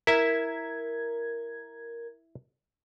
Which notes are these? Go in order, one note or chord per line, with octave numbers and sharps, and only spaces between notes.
E4 A#4 E5 G#6